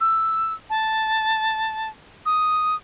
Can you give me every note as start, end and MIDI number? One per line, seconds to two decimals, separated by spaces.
0.01 0.54 88
0.70 1.89 81
2.26 2.75 87